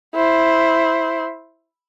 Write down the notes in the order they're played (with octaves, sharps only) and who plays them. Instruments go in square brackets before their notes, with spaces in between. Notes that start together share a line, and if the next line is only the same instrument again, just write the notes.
[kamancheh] E4 C5